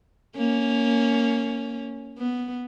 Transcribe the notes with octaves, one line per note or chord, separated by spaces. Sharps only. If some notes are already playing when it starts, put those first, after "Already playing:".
A#3 C#4
B3